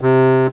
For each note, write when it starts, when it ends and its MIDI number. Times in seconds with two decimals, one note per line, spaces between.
0.01 0.47 48